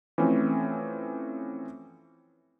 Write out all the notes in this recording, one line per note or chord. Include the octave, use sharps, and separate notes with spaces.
E3 F3 A3 C4 C#4